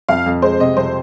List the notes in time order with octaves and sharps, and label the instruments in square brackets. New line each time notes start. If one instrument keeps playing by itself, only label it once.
[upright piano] F2 [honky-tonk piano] F5
[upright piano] F2
[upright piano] G#3 [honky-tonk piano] C5
[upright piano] C3 [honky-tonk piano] D#5
[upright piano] F2 [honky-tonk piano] C5